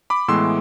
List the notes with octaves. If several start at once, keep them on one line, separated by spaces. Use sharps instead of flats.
B5 D6
A2 E3 G#3 B3 C6 E6